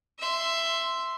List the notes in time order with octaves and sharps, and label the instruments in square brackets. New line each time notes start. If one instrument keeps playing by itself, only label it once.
[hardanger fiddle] E5 C6